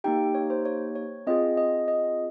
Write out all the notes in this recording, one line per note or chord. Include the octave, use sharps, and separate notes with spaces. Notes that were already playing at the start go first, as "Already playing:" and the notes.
A#3 D#4 G4 G5
C#5
C5
C#5
C#5
C4 F4 G#4 D#5
D#5
D#5